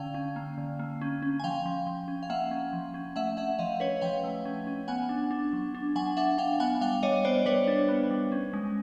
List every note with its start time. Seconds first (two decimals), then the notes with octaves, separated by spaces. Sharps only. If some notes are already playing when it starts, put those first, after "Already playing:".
Already playing: D3 C#4 F5 G5
0.14 C#4
0.36 A#3
0.58 D3
0.79 A#3
1.01 C#4
1.22 C#4
1.39 G#5
1.44 F3 F5 G5
1.66 F3
1.87 F3
2.08 C#4
2.23 F5
2.30 A#3 E5 F#5
2.51 C#4
2.73 F3
2.94 C#4
3.16 A3 E5 F#5
3.37 C#4 E5 F#5
3.58 F3 D#5 F5
3.80 C#4 B4 C#5
4.01 F3 F5 G5
4.24 A3
4.45 C#4
4.67 C#4
4.88 B3 F#5 G#5
5.09 D4
5.31 D4
5.53 F#3
5.74 D4
5.96 F#3 F#5 G#5
6.17 D4 E5 F#5
6.38 D4 F5 G5
6.60 B3 F#5 G#5
6.81 G3 F5 G5
7.03 G3 C#5 D#5
7.25 B3 C5 D5
7.46 G3 B4 C#5
7.67 D4
7.88 B3
8.11 G3
8.32 C#4
8.53 G#3